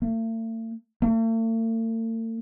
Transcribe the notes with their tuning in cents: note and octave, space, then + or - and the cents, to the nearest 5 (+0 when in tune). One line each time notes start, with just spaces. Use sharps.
A3 +45
A3 +45